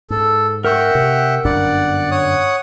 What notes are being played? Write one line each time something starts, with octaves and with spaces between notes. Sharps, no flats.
G#2 A4
A#4 E5 F#5 G5 C#6 G6
C3
G1 F#2 D4 D5 F#5
C#5 F#5 D#6